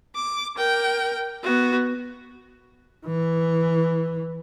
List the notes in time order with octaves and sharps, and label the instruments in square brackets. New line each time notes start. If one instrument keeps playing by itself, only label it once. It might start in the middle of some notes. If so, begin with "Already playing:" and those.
[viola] D6
A#4 G5
B3 F#4
[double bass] E3